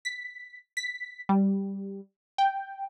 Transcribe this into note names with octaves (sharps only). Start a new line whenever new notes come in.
B6
B6
G3
G5